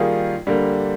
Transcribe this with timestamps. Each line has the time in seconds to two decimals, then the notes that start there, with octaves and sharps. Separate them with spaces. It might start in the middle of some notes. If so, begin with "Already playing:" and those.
Already playing: D#3 G3 A#3 F4 G#4
0.47 D3 G3 A#3